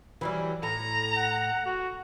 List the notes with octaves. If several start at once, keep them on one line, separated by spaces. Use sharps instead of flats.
E3 F#3 G3
A2 A#5
F#5
F#4